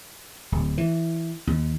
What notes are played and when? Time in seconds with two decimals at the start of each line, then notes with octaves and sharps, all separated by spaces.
0.52 D1
0.78 E3
1.47 D#2